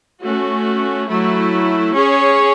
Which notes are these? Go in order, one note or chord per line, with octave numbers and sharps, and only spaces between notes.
A3 C#4 F#4
F#3 A3 E4
C#4 G#4 C#5